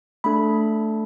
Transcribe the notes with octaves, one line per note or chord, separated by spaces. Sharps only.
A3 D4 A4 B5